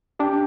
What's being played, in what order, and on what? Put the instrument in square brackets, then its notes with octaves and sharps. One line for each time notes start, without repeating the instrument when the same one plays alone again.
[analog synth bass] D4 [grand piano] G4